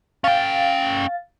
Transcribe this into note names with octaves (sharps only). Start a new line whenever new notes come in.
C#4 F5 G5 A6